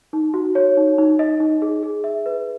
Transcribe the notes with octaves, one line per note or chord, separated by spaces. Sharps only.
D#4
F#4
C#5
D#4
D#4
D#5
D#4
G#4
G#4
E5
B4